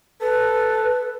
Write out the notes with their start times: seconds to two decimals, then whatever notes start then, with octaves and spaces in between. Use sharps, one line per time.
0.22 A4 B4